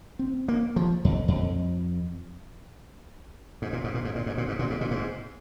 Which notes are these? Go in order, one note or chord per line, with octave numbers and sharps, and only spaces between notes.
C4
A#3
F3
F2
F2
G#2
A#2
G#2
A#2
G#2
A#2
G#2
A#2
G#2
A#2
G#2
A#2
G#2